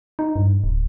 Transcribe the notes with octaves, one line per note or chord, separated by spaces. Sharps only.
D#4
G2
D1